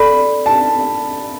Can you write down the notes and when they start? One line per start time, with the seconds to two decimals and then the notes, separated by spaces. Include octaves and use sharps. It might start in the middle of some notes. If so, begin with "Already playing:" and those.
Already playing: A4 D5 B5
0.46 A5